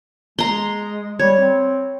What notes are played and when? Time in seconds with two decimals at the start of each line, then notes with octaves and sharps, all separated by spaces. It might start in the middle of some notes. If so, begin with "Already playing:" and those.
0.39 G#3 A#5 C6
1.19 G3 C#5
1.40 C4